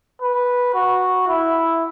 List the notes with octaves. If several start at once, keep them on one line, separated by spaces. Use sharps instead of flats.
B4
F#4
E4